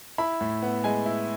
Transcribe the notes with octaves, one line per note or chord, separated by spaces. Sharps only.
E4 B5
A2
B3
G#3 G#5
E4